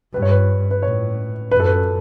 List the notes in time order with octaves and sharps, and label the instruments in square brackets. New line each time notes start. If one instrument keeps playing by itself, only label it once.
[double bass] G2 [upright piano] B4
[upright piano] C#5
B4
B4
[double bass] A2 [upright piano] C#5
[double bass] F#2 [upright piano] B4
[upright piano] A4
B4